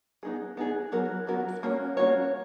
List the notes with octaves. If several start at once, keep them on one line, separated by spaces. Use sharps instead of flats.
B3 D#4 G#4
B3 D#4 G#4
F#3 B3 F#4 A#4
F#3 B3 F#4 A#4
A#3 C#4 F#4 C#5
A#3 C#4 F#4 C#5